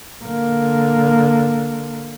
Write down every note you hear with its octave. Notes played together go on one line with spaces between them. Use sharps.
D3 A#3